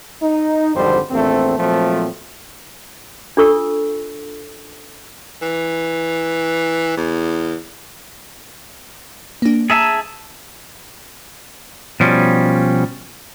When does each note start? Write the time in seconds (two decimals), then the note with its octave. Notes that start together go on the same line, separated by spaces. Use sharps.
0.22 D#4
0.75 G#1 F2 D3 G3 C5
1.11 A#1 E2 A3 C4
1.59 A#2 F3 F#3 A3 C4
3.37 D4 F4 A4 C#6 E6
5.42 E3
6.97 E2
9.42 A#3 D4
9.70 G#4 E5 A5 A#5
12.00 B2 F3 G3 C#4